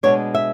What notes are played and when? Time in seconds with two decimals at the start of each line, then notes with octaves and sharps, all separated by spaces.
0.03 B2 G#3 B3 D4 C#5
0.35 E5